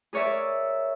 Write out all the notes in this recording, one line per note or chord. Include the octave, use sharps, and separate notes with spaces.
G#4 A#4 C#5 D5 E5